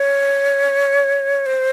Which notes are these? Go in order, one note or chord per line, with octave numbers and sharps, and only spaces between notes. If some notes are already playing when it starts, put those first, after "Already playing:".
Already playing: C#5
C5